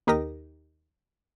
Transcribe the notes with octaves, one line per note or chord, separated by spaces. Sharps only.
D#2 D#4 G4 A#4 D#6 A#6